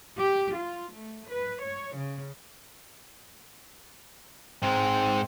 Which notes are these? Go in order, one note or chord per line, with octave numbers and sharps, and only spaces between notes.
G4
F4
A3
B4
C#5
C#3
G#2 G#3 C4